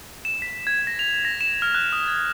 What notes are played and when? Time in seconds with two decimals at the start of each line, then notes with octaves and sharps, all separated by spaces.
0.25 E7
0.42 B6
0.67 G#6
0.87 A#6
0.99 F7
1.25 A#6
1.41 E7
1.62 F6
1.75 F#6
1.93 D#6
2.08 G#6